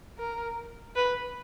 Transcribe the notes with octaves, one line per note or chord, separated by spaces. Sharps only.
A#4
B4